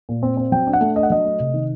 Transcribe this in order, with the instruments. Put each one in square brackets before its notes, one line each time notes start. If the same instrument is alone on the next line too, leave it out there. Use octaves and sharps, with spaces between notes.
[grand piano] A#2
C4
C4
F#3 G5
D4
F#5
A3
D4 D#5
F#5
F#3 D#5
A3
C3
D#3